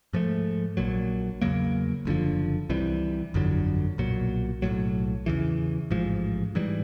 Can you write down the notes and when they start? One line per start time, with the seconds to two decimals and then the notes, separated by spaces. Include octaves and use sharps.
0.13 G#2 F3 A3
0.77 A#1 A#2 F#3
1.42 E2 C#3 F#3 A#3
2.05 F#1 F#2 D3 F3
2.69 C2 C3 E3 G3
3.34 G1 F2 D3 F#3
3.98 B1 A#2 F#3
4.62 B1 A2 F#3
5.26 E2 C#3 E3
5.91 A1 G#2 F3
6.55 G#2 E3 G3